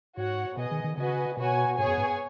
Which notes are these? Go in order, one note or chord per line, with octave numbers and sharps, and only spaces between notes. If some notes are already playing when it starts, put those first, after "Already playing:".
G#2 F#4 C#5 F#5
B2 B3 G#4 D#5
D#3
D#3
C#3 F#4 B4 D#5 G#5
B2 B3 F#4 C#5 G#5
G#2 B3 G#4 C#5 G#5
F#2
G#2